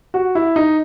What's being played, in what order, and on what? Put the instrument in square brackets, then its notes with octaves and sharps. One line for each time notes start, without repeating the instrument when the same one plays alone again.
[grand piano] F#4
E4
D#4